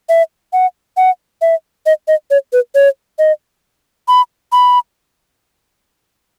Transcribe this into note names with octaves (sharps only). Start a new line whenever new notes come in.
E5
F#5
F#5
E5
D#5
D#5
C#5
B4
C#5
D#5
B5
B5